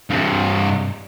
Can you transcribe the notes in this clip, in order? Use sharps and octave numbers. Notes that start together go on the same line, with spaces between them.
G2 C3